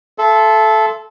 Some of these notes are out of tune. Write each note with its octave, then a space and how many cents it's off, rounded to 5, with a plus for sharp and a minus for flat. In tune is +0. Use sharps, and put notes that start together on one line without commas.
A4 -15 E5 +30 C6 +0